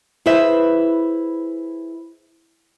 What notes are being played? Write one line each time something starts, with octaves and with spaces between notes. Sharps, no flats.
E4 G#4 B4 C5 E5